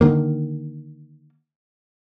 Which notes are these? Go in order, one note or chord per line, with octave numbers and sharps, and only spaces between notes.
D3 D#3 A#3